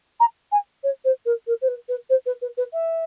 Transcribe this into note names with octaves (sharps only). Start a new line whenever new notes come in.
A#5
G#5
C#5
C5
A#4
A#4
C5
B4
B4
C5
B4
B4
B4
E5